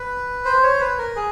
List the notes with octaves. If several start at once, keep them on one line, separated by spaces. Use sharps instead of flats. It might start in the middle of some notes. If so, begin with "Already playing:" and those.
Already playing: B4
C5
C#5
C5
B4
A#4
G#4